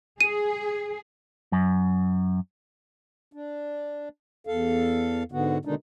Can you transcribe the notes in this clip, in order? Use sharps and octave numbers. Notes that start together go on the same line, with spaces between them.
G#4 D#7
F#2
D4
E2 A4 F5
G#2 D3 B3 F#4
B2 D3 D#3 G#3 D4 D#4